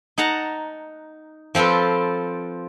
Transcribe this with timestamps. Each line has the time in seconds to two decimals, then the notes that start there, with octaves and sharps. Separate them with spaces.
0.18 D#4 F#5 A5 A#5
1.55 F3 C4 F4 A4 B4